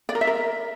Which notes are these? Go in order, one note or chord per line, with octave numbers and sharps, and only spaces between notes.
D5
A#4
E5
A#4